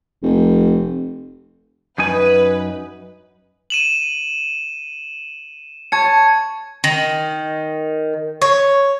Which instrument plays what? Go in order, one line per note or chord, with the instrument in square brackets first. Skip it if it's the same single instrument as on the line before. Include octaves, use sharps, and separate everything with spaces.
[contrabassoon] F1
[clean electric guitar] F#2 D#4 G#5 [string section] B4
[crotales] D#7 E7 F#7
[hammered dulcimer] A5 [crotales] C#6 G#6 C#7
[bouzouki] D#3
C#5